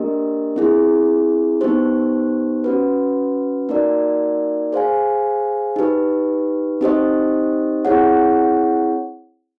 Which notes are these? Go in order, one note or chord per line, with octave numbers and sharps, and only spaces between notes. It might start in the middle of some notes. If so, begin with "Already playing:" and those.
Already playing: A#3 D4 G4 A#4 D#5
C4 E4 G#4
B3 D#4 G4 C5
C#4 F#4 B4
A#3 D#4 F#4 A#4 D5
G#4 C5 F5 G#5
D#4 G4 B4
C4 D#4 G4 C5 D#5
C4 E4 G#4 C#5 F#5